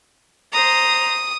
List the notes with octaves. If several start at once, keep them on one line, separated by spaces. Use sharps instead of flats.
C5 A#5 D#6